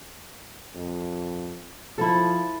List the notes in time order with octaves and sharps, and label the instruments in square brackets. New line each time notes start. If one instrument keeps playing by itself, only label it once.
[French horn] F2
[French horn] F3 [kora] E4 A4